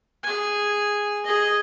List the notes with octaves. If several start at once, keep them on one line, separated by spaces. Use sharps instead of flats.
G#4 G#5
G#4 D#5